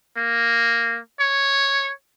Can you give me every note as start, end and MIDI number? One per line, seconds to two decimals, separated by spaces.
0.17 1.00 58
1.20 1.92 73